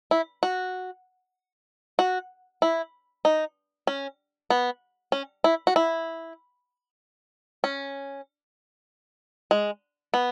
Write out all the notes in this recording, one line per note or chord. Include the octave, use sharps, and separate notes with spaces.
E4
F#4
F#4
E4
D#4
C#4
B3
C#4
E4
F#4
E4
C#4
G#3
B3